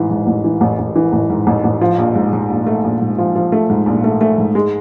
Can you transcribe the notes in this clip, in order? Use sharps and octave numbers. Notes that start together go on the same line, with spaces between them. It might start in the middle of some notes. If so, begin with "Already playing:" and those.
Already playing: A1 G#2 E3
G#2
A1
E3
A1
A1
E3
A1
G#2
A1
A1
F3
A#1
G#2
G#2
A#1
A3
A#1
G#2
F3
F3
A3
G#2
A#1
A3
A3
G#2
G#3